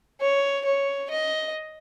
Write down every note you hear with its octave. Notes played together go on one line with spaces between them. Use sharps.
C#5
C#5
D#5